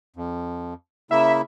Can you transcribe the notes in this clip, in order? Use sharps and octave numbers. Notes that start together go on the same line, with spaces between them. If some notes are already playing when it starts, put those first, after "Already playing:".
F2
C#3 A#3 E4 E5